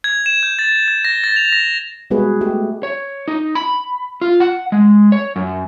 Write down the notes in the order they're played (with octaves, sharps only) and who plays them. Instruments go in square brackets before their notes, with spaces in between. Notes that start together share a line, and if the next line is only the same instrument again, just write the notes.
[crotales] G#6
E7
G6
A6
G#6
A#6
A6
F7
A#6
[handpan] G3 G#3 B3 F#4 G#4 B4
A3 G4
[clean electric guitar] C#5
D#4
B5
F4
F#5
G#3
C#5
F#2